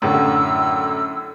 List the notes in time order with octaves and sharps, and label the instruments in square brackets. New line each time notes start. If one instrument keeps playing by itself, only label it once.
[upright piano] F#2 A2 D3 [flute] E6